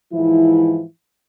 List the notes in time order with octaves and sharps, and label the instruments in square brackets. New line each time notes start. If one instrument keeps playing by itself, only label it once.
[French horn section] G#2 E3 F3 E4